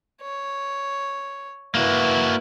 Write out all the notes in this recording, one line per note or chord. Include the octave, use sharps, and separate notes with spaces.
C#5
A#3 E4 F#4 B4